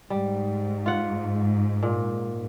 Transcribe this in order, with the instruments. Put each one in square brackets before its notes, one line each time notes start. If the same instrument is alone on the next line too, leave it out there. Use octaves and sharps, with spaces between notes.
[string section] G#2 [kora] G3
[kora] F4 F#5
A#2